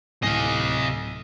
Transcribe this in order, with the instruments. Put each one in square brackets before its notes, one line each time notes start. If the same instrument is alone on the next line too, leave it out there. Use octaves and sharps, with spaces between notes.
[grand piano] D1 A2 C7 [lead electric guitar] C3 G#5 [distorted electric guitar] D#5 F5